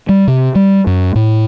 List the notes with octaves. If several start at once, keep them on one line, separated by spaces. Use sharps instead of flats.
G3
C3
G3
F#2
A2